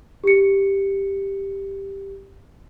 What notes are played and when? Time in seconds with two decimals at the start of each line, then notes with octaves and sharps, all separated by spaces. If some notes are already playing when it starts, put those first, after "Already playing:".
0.24 G4 C#7